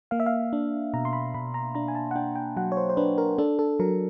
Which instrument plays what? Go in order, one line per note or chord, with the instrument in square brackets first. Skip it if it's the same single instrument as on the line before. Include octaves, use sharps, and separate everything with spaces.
[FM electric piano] A#3 F5
E5
F5
D4
B2 A#5
C6
B5
B2 B5
A#5
D4 A#5
G#5
A5
F#5
D4 G5
G5
F#3 F#5
C#5
C5
C5
D4 B4
A#4
D4 A4
A4
F#3 A#4